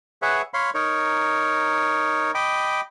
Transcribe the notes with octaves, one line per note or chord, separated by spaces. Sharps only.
G#4 B4 C#5 E5 F#5
C#5 F5 B5 C6
D#4 A#4 C#5
D#5 G5 B5 D6